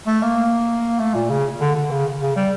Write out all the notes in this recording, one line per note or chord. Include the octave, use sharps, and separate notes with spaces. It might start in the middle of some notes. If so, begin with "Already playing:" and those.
A3
A#3
A3
A#2
C#3
D3
D3
C#3
C#3
G3